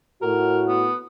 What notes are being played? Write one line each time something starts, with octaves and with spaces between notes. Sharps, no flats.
A2 F#4 A#4
B3